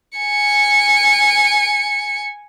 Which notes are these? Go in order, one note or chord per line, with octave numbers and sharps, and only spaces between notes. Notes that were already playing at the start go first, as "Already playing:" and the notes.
G#5 C#7